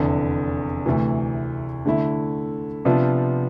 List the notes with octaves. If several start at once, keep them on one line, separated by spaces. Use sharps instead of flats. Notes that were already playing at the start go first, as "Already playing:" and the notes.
Already playing: F1 E2 D3
D2 C3 E3
D3 A3 E4
C3 F3 B3 D4 F4